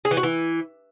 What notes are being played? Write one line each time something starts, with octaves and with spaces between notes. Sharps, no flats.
G#4
E3
F#4
E3